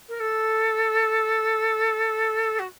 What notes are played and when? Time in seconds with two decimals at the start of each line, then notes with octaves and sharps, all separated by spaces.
0.09 A#4
0.20 A4
2.59 F#4